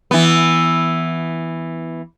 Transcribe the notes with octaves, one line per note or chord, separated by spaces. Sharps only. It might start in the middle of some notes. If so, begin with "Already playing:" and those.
E3 B3